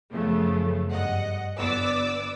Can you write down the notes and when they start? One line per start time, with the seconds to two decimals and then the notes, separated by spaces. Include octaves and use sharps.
0.12 F#2 C#3 F3 A3 B3
0.93 G2 D#5 F#5
1.58 G1 B3 D5 D6 E6